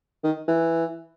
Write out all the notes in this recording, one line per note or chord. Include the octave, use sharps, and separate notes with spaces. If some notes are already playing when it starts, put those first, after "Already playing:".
D#3
E3